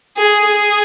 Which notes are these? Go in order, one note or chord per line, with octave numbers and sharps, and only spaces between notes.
G#4
G#4